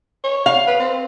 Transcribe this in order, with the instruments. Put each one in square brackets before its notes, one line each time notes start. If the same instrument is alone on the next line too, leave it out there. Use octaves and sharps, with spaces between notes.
[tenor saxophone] C#5
[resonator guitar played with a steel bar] F5
[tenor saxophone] B4
C4